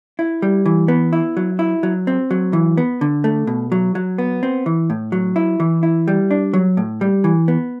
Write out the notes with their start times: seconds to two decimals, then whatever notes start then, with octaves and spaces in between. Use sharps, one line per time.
0.19 E4
0.42 G3
0.66 E3
0.88 B3
1.13 E4
1.37 F#3
1.59 E4
1.83 F#3
2.07 C4
2.31 F#3
2.53 E3
2.77 B3
3.01 D3
3.24 A3
3.47 B2
3.72 F#3
3.95 F#3
4.18 B3
4.43 C4
4.66 E3
4.90 A2
5.12 F#3
5.36 E4
5.60 E3
5.83 E4
6.08 G3
6.31 D4
6.53 F#3
6.77 A2
7.01 G3
7.24 E3
7.48 B3